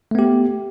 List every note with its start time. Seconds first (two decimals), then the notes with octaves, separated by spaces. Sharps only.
0.11 A3
0.15 B3
0.19 G4